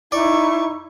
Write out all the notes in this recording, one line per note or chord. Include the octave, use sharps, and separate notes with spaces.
D#4 E4 D5 C#6